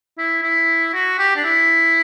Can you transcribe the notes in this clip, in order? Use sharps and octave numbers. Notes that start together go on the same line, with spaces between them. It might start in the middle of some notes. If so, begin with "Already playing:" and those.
E4
E4
F#4
G4
D4
E4